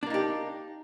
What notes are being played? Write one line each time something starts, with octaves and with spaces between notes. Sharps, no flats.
A#3 D4 D#4 G4